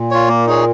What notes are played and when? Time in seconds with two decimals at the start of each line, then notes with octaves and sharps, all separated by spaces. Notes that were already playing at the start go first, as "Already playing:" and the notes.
Already playing: A#2
0.11 F4 C#5
0.28 A#3
0.46 D#4 G#4 C#5